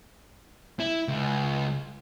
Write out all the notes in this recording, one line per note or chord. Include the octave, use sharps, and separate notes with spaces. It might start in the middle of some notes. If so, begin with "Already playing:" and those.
E4
C#2